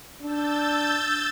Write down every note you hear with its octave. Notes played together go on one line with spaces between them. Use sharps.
D4 E6 G6 A6